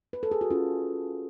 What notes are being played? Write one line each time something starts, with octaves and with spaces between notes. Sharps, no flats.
B4
A4
G#4
F#4
C#4 F4